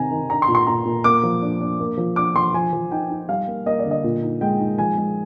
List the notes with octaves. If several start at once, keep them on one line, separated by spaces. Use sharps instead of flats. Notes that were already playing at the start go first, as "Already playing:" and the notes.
Already playing: C3 D#3 C4 G#5 A#5
D#3
D4 A#5
C6
A#2
C6
A#2 A#5
A#2
A#3 D6
F3
D4
D4
A#3
F3
D4 D6
F3 C6
F3 G#5
F3
D#4 G5
D#4
G3 F5
A#3
A#3 D#5
D5
D3
D#5
A#2
D#4
G#3 G5
D#4
F3 G#5
G#3